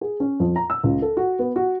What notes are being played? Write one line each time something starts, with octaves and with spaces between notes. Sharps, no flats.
G#4
C#4
F2
A#5
E6
C#2
A4
F#4
B3
F#4